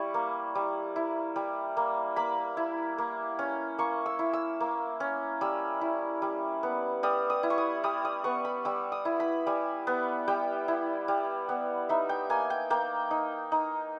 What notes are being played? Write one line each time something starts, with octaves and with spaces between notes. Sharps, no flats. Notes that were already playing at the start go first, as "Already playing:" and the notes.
Already playing: G3 E4 C#6
A#3
G3
E4
G3
A#3
A#3 B5
E4
A#3
C#4
A#3 C#6
E6
E4
E6
A#3
C#4
G3 E6
E4
G3
B3
G3 D#6
D#6
E4
C#6
D#6
G3 D#6
D#6
B3 C#6
B5
G3 E6
D#6
E4
B5
G3 G#5
B3
G3 G5
E4
G3
B3
D#4 E5
G5
A#3 G#5
G5
A#3 G5
D#4
D#4